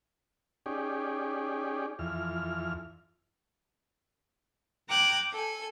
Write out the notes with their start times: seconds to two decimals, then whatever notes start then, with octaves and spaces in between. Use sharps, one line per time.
0.66 C#4 D#4 G4 G#4 D5
1.99 F2 E3 F6
4.89 G5 A#5 D6 F#6 G#6
5.33 A4 G#5